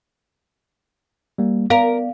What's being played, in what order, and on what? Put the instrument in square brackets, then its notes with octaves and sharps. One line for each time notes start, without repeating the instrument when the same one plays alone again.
[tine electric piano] G3 A#3
[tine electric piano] B3 D5 [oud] A#4 [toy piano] F5